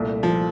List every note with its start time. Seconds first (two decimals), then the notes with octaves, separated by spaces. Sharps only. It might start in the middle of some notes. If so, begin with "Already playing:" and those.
Already playing: C2 A#2 A3
0.23 F3